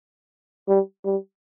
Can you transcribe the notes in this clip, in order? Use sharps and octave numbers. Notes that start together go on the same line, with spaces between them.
G3
G3